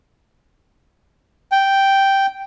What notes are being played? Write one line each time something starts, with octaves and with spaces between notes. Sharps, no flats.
G5